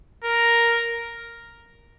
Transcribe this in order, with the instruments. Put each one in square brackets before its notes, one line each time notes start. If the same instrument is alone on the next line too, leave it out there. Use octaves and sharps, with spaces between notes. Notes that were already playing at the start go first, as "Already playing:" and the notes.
[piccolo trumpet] A#4